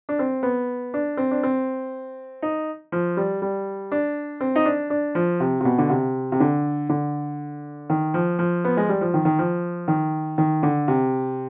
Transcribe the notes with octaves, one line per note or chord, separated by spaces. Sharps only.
D4
C4
B3
D4
C4
D4
C4
D#4
F3
G3
G3
D4
C4
D#4
D4
D4
F3
C3
C3
B2
D3
C3
C3
D3
D3
D#3
F3
F3
B3
G#3
G3
F3
D#3
D#3
F3
D#3
D#3
D3
C3